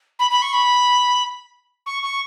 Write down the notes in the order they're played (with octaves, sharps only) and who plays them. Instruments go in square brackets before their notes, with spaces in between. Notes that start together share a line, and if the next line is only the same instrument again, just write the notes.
[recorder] B5
B5
C#6
B5
C#6
C#6